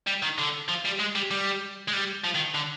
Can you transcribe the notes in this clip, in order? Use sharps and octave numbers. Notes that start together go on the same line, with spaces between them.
G3
D#3
D3
F3
G3
G#3
G3
G3
G#3
G3
F3
D#3
D3